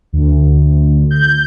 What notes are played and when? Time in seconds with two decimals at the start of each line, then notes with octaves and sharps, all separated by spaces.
0.13 D2
1.11 G6